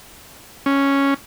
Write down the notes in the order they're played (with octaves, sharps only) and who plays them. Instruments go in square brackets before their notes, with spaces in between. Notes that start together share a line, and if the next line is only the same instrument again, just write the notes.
[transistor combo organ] C#4